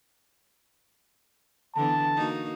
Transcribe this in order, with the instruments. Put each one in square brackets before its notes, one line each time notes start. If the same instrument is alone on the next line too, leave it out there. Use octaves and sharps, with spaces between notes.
[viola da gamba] D3 E3 B3 [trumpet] A5
[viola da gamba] A#3 D#4 F#4